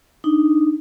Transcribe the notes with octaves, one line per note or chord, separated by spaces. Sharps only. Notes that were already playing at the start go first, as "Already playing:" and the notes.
D4 D#4